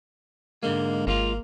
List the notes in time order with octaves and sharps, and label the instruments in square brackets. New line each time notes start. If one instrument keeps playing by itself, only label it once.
[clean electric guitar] G#2 D3 G#3 [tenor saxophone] A#3
[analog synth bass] G#1 [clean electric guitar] G#3 F4 [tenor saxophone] A#3